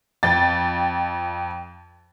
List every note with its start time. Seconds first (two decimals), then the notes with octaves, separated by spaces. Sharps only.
0.23 F2 G5 A6